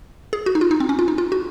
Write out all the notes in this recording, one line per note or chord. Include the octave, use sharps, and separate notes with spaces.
G#4
F#4
D#4
F4
D#4
C4
C#4
F4
D#4
F4
F#4